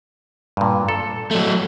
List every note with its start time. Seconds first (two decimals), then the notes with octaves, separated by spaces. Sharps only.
0.57 G2 A#2
0.89 A4
1.31 F#3 A3